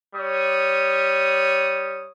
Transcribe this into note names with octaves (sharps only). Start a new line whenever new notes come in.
G3 C#5 D#6